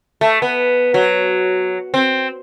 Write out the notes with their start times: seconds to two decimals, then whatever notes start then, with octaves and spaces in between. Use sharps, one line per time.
0.21 A3
0.42 B3
0.94 F#3
1.94 C4